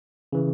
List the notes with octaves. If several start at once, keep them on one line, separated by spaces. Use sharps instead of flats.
C#3 E3